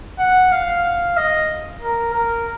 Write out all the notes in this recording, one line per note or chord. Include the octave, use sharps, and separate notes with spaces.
F#5
F5
D#5
A#4
A#4